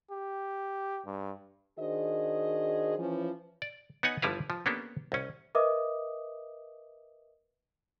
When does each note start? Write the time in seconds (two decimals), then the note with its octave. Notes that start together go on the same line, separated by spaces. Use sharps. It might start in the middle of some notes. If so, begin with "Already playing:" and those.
0.11 G4
1.05 G2
1.79 D#3 D4 F#4 G#4 C5 D#5
2.98 E3 F3 C#4
3.62 D5
4.03 B3 D#4 C#5 F#5 G#5
4.22 G1 F3 G3 E4 B4 F5
4.50 F3
4.66 A#3 B3 C#4 D4 G4 A4
5.12 C2 C#4
5.55 A#4 B4 D#5 E5 D6 D#6